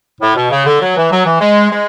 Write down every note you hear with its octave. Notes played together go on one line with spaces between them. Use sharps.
A2
B2
C#3
D3
F#3
E3
F#3
E3
G#3
G#3